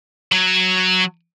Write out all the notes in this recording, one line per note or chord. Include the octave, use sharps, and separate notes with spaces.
F#3